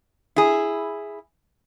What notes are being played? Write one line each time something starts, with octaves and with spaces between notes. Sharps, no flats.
E4 G#4